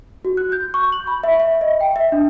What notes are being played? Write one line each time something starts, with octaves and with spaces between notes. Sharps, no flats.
F#4
F#6
G6
C#6
F#7
B5
E5
E5
D#5
G5
E5
D4